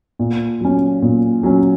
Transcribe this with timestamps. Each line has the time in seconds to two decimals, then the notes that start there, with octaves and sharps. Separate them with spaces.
0.19 A#2
0.61 F#3 C#4
1.02 A#2
1.43 F#3 C#4